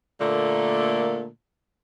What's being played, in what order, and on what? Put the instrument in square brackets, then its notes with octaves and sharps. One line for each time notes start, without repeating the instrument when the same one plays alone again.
[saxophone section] A#2 D3 A3 A#3